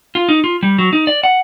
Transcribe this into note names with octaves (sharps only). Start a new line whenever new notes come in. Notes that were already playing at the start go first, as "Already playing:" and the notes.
F4
D#4
F4
G3
F#3
D#4
D5
F#5